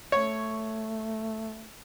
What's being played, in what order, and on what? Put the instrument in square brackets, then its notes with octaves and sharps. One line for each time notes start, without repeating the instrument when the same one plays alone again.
[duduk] A3 [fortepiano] C#5